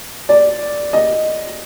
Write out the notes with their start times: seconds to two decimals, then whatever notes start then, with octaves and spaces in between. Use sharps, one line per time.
0.29 D5
0.93 D#5